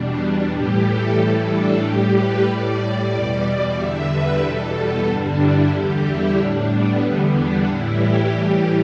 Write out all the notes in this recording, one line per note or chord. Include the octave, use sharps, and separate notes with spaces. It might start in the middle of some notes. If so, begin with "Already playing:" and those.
Already playing: E2 B2 G3 D4
A2 E3 G3 G4
A4
A2 E3 G3 A4
D4
A2 G3 G4
B4
G3 D5
A2
E2 B2 G3 D5
E2 D3 G3 E5
B4
E2 B2 G3 A4
B3
G2 D3 G3 D4
E4
E2 D3 G3 G4
E4
A2 G3 D4
B3
E2 D3 G3 B3
D4
A2 E3 G3 E4
G4
A2 E3 G3